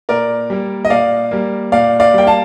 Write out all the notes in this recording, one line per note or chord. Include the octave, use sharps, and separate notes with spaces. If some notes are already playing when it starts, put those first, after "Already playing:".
A#2 A#4 D5
G3 A#3
D#5
A#2 D5 F5
G3 A#3
A#2 D5 F5
D5 F5
G3 A#3 G5
F5 A5